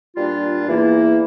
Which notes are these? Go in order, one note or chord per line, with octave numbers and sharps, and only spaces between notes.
A#2 G3 D4 F4
E2 E3 A#3 E4